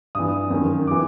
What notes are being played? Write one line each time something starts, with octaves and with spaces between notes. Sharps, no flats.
G2 E3 D#6
F#2 D#3
E3 D6